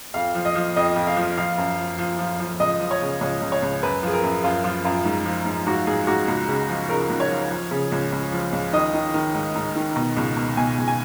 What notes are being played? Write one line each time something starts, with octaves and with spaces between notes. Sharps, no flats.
F2 F5
F3
D#5
F3
F2 D#5
F2
F5
F3
F3 F5
F#2
F3
F3
F3
F3
C#2 D#5
F3
C#5
C#3
C#2 C#5
C#2
C#5
C#2
F#2 B4
F3 G#4
A#4
F#2
F#2 F4
F3 F4
F#2 F4
G#2
F3
G#2
G#2 F#4
G#2 G#4
G#2 F#4
C#2
C#3
F3
C#3 A#4
C#2
C#5
F3
F3
C#3
C#2
C#2
F3
C#2
D#3 D#5
D#3
D#3
G#2
G#2
D#3
B2
C#2
B2
B2 G#5
C#2
G#5